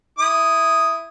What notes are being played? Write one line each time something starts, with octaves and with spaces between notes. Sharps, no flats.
E4 D#6